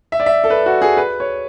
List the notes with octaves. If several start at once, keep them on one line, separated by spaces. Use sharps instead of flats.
E5
D5
E5
A4
B4
F#4
G#4
B4
C#5